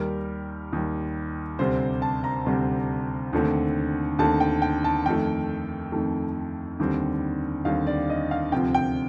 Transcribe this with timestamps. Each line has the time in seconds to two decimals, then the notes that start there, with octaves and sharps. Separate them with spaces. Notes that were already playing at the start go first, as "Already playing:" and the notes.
Already playing: D#2 D#3 G3 A#4
0.73 D#2 D#3 G3
1.59 D2 C3 G3 C4 C5
2.02 A5
2.24 A#5
2.46 D2 C3 G3 C4
3.33 D#2 D3 A3 C4
4.19 D#2 D3 A3 C4 A5
4.40 G5
4.62 G5
4.84 A5
5.06 F2 D#3 A3 G5
5.92 F2 D#3 A3
6.80 D#2 D3 G3 C4
7.65 D#2 D3 G3 C4 F5
7.87 D5
8.10 D#5
8.31 F5
8.52 D2 C3 F3 C4 G5
8.75 G5